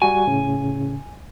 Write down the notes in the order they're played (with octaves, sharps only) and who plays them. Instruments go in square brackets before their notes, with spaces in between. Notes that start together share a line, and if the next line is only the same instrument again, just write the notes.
[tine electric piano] G3 F#4 [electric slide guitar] G#5
[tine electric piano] A2 C#3 C#4